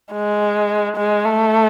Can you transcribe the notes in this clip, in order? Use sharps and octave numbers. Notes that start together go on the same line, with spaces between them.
G#3
G#3
A3